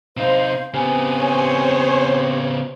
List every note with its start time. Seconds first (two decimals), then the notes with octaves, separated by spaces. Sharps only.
0.17 C3 D#4 C5 F5
0.74 C#3 B3 C4 G4 G#5
1.16 C5 C#5